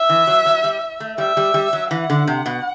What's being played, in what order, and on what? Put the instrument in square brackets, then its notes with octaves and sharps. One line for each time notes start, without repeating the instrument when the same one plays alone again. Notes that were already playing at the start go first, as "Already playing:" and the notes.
Already playing: [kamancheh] E5
[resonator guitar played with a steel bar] E3
F#3
F#3
G3
A3
[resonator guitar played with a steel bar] G3 [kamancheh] E5
[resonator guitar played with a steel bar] G3
G3
F#3
[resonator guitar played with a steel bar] E3 [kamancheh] F#5
[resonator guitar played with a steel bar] D3
C3
B2